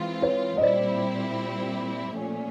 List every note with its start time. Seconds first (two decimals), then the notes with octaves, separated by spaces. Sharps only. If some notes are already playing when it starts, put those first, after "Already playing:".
Already playing: E3 G#3 C4 F4
0.22 B4 C#5
0.57 D#5
0.61 A#2 G3 C4 E4 G4 C5 D5
2.15 A#2 F3 A3 C#4